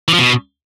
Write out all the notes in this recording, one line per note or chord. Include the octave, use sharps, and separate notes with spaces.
E3
F3
B2